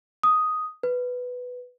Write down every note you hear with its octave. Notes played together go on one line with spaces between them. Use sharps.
D#6
B4